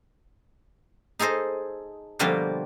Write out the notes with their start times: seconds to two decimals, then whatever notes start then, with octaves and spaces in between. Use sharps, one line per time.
1.19 D#4 G#4 A4 C5 D#5
2.19 B2 D3 F3 G3 A#3 F4